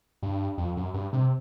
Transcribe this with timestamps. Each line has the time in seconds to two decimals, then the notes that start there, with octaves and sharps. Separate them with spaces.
0.22 G2
0.58 F2
0.77 F#2
0.94 G2
1.13 C3